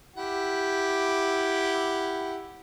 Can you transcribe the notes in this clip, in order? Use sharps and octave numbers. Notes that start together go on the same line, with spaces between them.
E4 G4 F#5